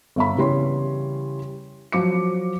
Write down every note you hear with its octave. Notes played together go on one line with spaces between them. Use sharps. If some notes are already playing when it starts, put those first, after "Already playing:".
G1 E5 B5
C#3 E3 G3 C#5 C6
F3 F#3 D6 C#7